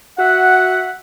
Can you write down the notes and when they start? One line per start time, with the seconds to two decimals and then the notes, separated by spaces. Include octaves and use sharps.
0.18 F#4 E5 F#5